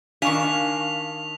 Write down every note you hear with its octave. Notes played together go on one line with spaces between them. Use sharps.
D#3 D4 F5 G#5 C#6 B6 F7